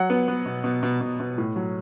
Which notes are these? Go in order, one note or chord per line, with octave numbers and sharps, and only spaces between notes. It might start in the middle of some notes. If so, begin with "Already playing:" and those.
Already playing: F#3 F#5
B3
B3
B2
B2
B2
B2
B2
A2
F#3